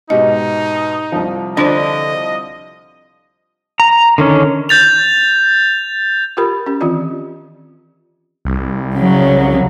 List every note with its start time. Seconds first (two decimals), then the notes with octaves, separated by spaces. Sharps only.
0.10 G#2 B2 D#4 G4 D#5
1.12 C2 F3
1.57 D3 D4 F4 C5 D#5
3.80 A#5
4.18 D3 D#3 C#4
4.69 G6 A6 F7
6.37 F4 G4 A#4 B5
6.66 C#4 G4
6.81 D#3 E3 C4 F4 D5
8.45 C2
8.97 C#3 F#3